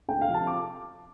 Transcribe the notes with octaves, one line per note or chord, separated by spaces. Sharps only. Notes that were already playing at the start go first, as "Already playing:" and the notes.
D2 G5
F5
C3 F3 C4
A5
D6